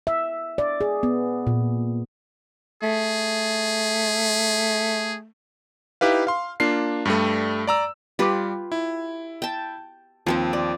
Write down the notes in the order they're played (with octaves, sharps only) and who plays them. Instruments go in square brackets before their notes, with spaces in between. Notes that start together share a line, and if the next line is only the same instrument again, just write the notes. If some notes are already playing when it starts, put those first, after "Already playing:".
[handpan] E5
D5
G#4
B3
A#2
[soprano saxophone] A3 [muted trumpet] G#4
[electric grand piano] D#4 E4 G4 B4 F5
F5 C6
A#3 D4 F4 C7
G2 G3 A3
D5 A#5 E6
[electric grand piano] G3 D6 [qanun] F4 G4 B4
[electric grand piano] E4
[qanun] G5 A5
[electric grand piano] D#2 [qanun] F3 C4 C5
[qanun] D5